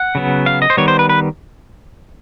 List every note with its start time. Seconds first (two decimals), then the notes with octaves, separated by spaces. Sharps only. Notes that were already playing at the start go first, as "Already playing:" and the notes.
Already playing: F#5
0.15 C#3 F#3 B3
0.46 F5
0.62 D#5
0.70 C5
0.77 D#3 G3 B3 C#5
0.88 C5
0.99 B4
1.09 B4